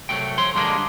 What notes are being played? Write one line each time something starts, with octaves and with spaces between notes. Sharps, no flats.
C2 F#3 A3 G5
F3 C#5 C6
G2 D3 G3 G#3 A#3 D4